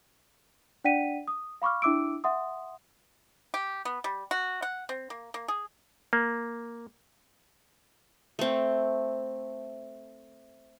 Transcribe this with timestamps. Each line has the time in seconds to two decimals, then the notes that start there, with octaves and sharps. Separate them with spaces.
0.84 D4 D5 F#5 G5 B6 D#7
1.28 D#6
1.62 F5 B5 C#6 D6 F6
1.82 D4 E4 E5 D6 E6 D7
2.24 E5 F#5 C6 D#6
3.54 G4
3.85 B3
4.04 G3
4.31 F#4
4.62 F#5
4.89 C4
5.10 A#3
5.34 A#3
5.48 G#4
6.13 A#3
8.39 A3 C4